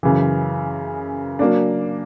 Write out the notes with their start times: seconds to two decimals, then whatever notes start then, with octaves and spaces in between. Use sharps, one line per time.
0.03 F#2 C#3 E3
1.39 F#3 A#3 D4